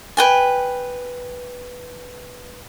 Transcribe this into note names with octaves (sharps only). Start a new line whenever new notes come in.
B4 G5 G#5